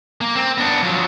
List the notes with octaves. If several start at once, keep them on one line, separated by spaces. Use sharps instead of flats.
A#3
C4
B3 D4
F3 F#3